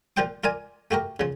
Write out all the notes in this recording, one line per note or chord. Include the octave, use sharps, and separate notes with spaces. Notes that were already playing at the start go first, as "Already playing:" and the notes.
A#2 F3 F4 C5 G5 D6
F4 A#4 D5 G#5
A3 F#4 G4 A#4
C#3 F3